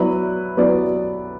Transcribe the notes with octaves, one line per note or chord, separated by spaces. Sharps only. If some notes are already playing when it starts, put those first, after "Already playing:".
Already playing: F#3 B3 E4 B4 D5
F#3 B3 E4 B4 D5